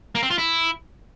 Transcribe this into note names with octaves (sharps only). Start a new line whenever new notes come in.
A#3
C4
F4
E4